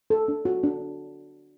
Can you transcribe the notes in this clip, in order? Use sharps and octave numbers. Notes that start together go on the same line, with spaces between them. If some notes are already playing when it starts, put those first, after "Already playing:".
A4
D4
F#4
D4